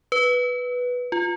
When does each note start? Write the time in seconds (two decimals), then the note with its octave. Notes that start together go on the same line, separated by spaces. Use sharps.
0.12 B4
1.12 F4